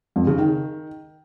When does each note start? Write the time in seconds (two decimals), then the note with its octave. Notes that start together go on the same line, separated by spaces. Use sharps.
0.16 F2
0.27 C#3
0.38 D#3